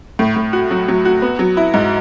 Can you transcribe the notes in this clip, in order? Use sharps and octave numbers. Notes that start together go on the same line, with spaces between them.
A2
A2
F#4
F#3
F#3
F#4
B3
F#3
E4
G#2